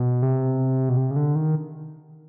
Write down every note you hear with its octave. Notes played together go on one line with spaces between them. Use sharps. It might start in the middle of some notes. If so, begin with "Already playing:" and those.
Already playing: B2
C3
B2
C3
C#3
D3
D#3